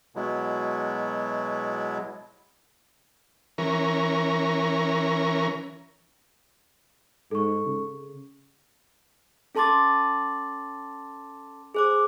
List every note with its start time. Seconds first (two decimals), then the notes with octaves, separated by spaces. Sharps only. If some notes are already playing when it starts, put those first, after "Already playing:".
0.16 B2 F#3 G#3 B3 E4
3.58 E3 C#4 A#4
7.31 G#2 A4 C#6
7.66 C#3
9.55 C#4 A4 A5 C6 D6 A6
11.74 G#4 C5 D6